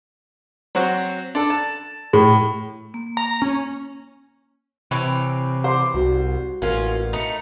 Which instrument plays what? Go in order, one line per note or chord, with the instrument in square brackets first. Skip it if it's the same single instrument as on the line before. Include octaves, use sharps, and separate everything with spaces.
[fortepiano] F#3 C4 F#4
D4 A4
A5
[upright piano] A2
[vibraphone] A#3
[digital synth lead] A#5
C#4
[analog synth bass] C3 [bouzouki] E3 C4 C#5
[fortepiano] C5 C6 [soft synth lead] D6
[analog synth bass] C2 [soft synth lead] F#4
[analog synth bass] A1 [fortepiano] A#3 [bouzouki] C#4 F4
[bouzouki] A3 D#4 [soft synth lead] C#7